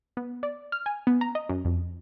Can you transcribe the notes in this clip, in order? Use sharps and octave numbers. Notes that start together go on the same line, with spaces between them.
B3
D5
F6
G#5
B3
A#5
D#5
F#2
F2